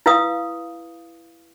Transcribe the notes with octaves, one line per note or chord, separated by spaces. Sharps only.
E4 B4 F5 D#6